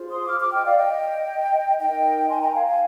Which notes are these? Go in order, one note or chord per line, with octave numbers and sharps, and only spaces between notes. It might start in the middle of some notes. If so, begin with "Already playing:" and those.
Already playing: F4 G#4 C5
C6 D#6
D6 F6
D6 F6
D#5 G5
D5 F5
D#5 G5
D#4 A#4 D#5 G5
G#5 C6
G5 A#5
F5 G#5
F5 G#5